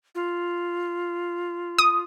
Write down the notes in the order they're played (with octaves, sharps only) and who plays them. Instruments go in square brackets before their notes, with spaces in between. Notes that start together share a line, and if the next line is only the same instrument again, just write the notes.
[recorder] F4
[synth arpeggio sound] D#6